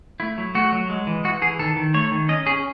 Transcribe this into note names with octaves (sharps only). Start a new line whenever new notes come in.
A3 E4
F#3
A3 F#4
F#3
G#3
E3
E3 F#4
E3 G#4
D#3 A4
D#3
A3 C#5
D#3
C#4 D#5
C#4 G#4